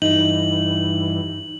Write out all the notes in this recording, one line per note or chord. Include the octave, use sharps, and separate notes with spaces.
G2 E3 D#4 F#7